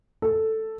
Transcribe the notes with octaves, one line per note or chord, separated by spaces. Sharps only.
A4